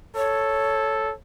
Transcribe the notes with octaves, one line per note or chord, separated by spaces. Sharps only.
A4 C#5